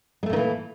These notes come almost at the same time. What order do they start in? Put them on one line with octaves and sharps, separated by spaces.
G#3 A3 A#2 D#3 E3